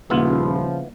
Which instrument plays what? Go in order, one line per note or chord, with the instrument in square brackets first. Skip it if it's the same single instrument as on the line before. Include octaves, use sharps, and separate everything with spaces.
[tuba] D#1 [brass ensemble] C#3 F3 [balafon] G3 A#3 [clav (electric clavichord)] B3 E4 F4